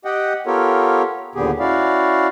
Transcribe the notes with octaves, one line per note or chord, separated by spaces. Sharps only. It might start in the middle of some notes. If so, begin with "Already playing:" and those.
G4 D#5 F#5 G5
B3 F4 G4 A4 A#4 C#5
D#2 A#2 D3 B3 G4 G#4
C#4 E4 F#4 D5 F5